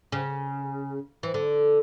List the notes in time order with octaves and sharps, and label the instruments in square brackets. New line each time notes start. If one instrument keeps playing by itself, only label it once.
[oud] C#3
E3
D3